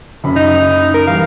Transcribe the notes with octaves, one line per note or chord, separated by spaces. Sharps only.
F#1 F#2 B5
D#4
A#4
E3 G3 F5